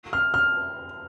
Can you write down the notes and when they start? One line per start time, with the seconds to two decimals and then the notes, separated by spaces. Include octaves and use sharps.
0.13 F6
0.34 F6